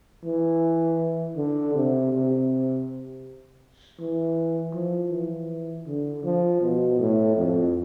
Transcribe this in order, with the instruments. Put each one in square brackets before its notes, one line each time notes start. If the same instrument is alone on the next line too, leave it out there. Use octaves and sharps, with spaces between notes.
[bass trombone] E3
D3
C3
C3
E3
F3
E3
D3
F3
B2
A2
F2